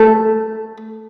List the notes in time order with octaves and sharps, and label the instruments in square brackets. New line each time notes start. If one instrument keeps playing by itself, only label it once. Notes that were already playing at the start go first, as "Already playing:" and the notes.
Already playing: [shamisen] A3